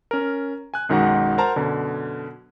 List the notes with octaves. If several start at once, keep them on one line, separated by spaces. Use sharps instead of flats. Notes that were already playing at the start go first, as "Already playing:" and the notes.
C#4 A#4
G#5 F#6
B1 F#2 D#3 G#3 F#4 F#5
A#4 C5 F#5 A5 A#5
F#2 B2 D3